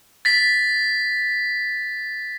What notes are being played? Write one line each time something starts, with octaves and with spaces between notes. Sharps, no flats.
A6 B6